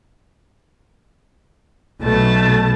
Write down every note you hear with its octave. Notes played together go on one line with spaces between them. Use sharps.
B1 B2 A3 A5